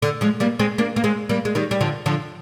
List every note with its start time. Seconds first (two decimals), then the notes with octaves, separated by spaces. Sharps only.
0.02 D3
0.21 F3 G#3
0.40 G3 A#3
0.59 G#3 C4
0.78 A#3 D4
0.96 A#3
1.04 G#3 C4
1.29 G3 A#3
1.45 G#3
1.55 D#3 G3
1.71 G3
1.81 D3 F3
2.06 D3 F3